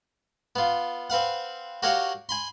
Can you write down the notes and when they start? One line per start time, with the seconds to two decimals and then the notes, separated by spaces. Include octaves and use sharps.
0.56 B3 F4
1.10 C4 B4 F5 F#5
1.83 F#4 G4 A#4 C#5 F5 F#5
2.29 G#5 B5 C6